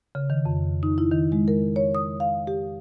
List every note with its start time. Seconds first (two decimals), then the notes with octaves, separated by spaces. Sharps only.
0.15 C#3
0.30 D#3
0.45 F2
0.83 D#4
0.98 E4
1.11 D#3
1.32 G#3
1.48 A#4
1.76 C#5
1.95 D#6
2.20 F5
2.47 G4